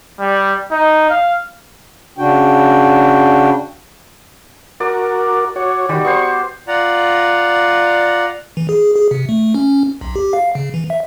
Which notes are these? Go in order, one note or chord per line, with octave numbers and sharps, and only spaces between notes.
G3
D#4
F5
C#3 D4 F#4 G5
F#4 A#4 D5
F#4 C#5
D#3 G3 F#4
B3 C5 C#6
F4 D5 F#5 A#5
E3
G#4
G#4
C3
A3
C#4
B1
G4
F5
C#3
E3
E5